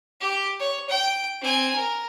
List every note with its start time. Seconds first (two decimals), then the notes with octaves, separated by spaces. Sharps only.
0.21 G4
0.60 C#5
0.89 G5
1.41 C4 G#5
1.76 A#4